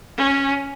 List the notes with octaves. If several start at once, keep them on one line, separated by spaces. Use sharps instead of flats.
C#4